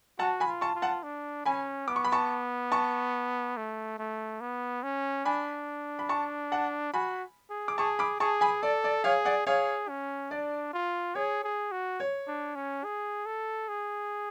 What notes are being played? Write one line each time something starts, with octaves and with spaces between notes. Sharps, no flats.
F#4 F#5 A5
G#5 B5
F4
A5 C#6
F4
F#5 A5
D4
C#4 G#5 B5
B3 D6
C#6
B5
A5 C#6
A5 C#6
A3
A3
B3
C#4
D4 G#5 B5
B5
A5 C#6
F#5 A5
F#4 G#5 B5
G#4
D6
G#4 A5 C#6
B5 D6
G#4 A5 C#6
G#5 B5
A4 D5
D5
G#4 C#5 F5
D5 F#5
G#4 C#5 F5
C#4
D4 D5
F4
G#4 C#5
G#4
F#4
C#5
D4
C#4
G#4
A4
G#4